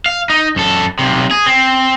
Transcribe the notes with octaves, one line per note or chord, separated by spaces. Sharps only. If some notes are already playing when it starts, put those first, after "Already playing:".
F5
D#4
F#2 A4
B1 C3
G#4
C4